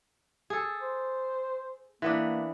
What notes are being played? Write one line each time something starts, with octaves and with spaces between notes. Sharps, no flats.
G#4 A4
C5
E3 A#3 B3 D4